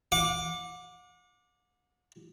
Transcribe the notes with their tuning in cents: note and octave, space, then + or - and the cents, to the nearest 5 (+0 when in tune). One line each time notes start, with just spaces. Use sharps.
F#5 -40 D6 +0